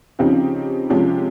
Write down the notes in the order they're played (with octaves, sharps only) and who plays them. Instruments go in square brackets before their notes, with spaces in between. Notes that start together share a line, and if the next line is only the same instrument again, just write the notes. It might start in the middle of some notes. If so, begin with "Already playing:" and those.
[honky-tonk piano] C#3 F3 C4 D#4 G4
C3 F3 G#3 C#4 G4